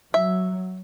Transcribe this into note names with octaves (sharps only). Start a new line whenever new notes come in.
F#3 E5